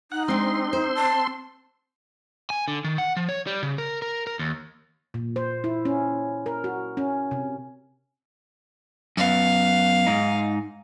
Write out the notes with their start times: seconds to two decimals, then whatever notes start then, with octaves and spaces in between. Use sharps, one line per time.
0.12 D#4 F#5
0.28 G#3 C4 D4 C6
0.73 C5
0.95 A5
2.50 G#5
2.68 D3
2.84 D#3
2.98 F#5
3.17 F3
3.29 C#5
3.47 G3
3.63 C#3
3.78 A#4
4.02 A#4
4.27 A#4
4.39 D#2
5.14 A#2
5.36 C5
5.64 E4
5.85 C#4
6.46 A#4
6.64 F#4
6.97 C#4
7.31 C3
9.17 F#2 B3 F5
10.07 G#2 D#4